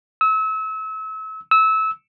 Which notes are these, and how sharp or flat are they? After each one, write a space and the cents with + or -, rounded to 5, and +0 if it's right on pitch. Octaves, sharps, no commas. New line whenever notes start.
E6 -35
E6 -25